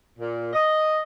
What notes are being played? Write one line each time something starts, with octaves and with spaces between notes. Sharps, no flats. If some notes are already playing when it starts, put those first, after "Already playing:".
A#2
D#5